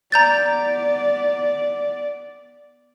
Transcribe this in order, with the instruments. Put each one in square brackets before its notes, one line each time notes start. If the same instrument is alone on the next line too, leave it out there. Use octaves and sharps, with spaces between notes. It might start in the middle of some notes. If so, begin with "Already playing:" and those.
[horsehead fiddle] B3 D5 [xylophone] A#5 G6 A6